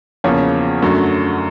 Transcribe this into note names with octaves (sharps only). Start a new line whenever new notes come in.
E2 C#3 F3 A#3 C#5
F#2 D3 F#3 A3